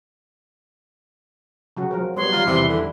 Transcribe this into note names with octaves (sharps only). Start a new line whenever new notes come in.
C#3 F#3 F#4
F3 F#3 A#4
G3 B3 C#5 C6
D#3 G3 F4 A#5
E2 C3 E3
D3